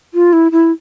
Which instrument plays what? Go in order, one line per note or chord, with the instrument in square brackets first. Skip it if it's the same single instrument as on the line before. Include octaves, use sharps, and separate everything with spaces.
[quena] F4
E4
E4